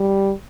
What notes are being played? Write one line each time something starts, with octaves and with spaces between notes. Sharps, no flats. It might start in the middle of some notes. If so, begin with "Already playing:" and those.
Already playing: G3